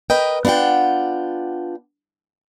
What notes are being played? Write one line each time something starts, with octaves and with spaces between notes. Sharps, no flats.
A#4 B4 D#5 G5
B3 D4 F4 F#5 G5